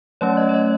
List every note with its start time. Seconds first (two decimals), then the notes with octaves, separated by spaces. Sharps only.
0.21 F#3 A3 C#4 C#5
0.37 D#5
0.49 C#5
0.54 D#5